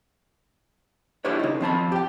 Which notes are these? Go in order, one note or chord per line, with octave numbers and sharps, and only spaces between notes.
D4 E4 F#4 G4 B4 C#5
C#3 D#4
F2 C4 A5 B5
G4 G5